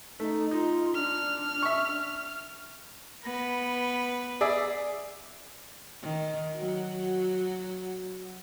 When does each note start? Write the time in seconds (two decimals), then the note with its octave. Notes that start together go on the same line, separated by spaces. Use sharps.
0.20 A3 D#4
0.51 D#4 F4
0.95 D4 F6
1.63 E5 C#6
3.24 B3 B4
4.41 G#4 D5 E5
6.02 D#3
6.55 F#3 F#4